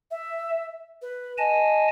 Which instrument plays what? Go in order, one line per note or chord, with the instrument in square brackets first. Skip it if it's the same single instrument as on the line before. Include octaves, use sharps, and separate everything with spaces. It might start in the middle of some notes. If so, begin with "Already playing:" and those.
[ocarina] E5
B4
[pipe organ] D#5 G#5 A5